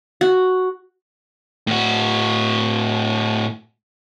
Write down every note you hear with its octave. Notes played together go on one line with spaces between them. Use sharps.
F#4
A2 F#4